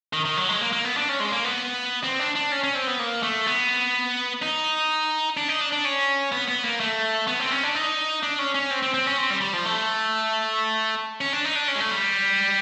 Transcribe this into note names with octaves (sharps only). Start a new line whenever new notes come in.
D#3
D#3
F#3
G#3
A#3
A#3
B3
D4
C#4
G#3
A#3
B3
C4
D4
D4
C#4
C#4
C4
B3
A#3
A3
B3
D#4
D4
D#4
D4
D4
C#4
B3
B3
A#3
A3
B3
C4
C#4
D4
D#4
D4
C#4
C#4
C4
C4
C4
C#4
C4
G3
G3
F3
A3
C#4
D4
D#4
D4
C#4
G#3
A3
G3